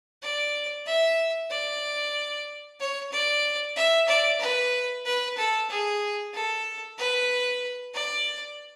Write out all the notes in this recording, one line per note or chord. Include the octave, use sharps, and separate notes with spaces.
D5
E5
D5
C#5
D5
E5
D5
B4
B4
A4
G#4
A4
B4
D5